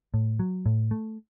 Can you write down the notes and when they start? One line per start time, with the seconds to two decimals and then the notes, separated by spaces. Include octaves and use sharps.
0.14 A2
0.39 F#3
0.66 A2
0.91 A3